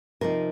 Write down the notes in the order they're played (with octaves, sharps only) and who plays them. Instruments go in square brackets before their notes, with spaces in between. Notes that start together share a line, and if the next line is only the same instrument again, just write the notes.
[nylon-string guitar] C3 F3 C4 D#4 A#4